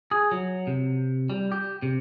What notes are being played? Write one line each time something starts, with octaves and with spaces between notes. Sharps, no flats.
G#4
F#3
C3
G3
G4
C3